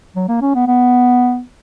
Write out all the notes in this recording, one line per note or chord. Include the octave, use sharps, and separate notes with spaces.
F#3
A#3
C#4
B3
B3